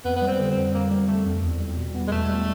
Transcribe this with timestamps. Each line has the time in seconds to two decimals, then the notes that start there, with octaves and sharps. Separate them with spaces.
0.05 F2 B3
0.16 B3
0.22 G3
0.28 C4
0.39 D3
0.51 C4
0.57 F2
0.74 F2 A#3
0.91 G3 A#3
1.08 D3 A3
1.26 F2
1.42 E2
1.60 G3
1.77 B2
1.95 B3
2.08 G#3
2.11 E2 A3
2.29 G3